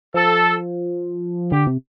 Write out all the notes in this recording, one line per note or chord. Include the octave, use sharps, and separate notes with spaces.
F3 A4
D3 G4
C3